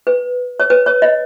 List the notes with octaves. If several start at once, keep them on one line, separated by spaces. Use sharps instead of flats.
B4
C#5
B4
C#5
D#5